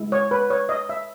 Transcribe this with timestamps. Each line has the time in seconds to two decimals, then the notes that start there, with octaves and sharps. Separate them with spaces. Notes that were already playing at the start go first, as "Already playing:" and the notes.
Already playing: G#3 E4
0.12 C#5
0.31 B4
0.50 C#5
0.69 D#5
0.89 E5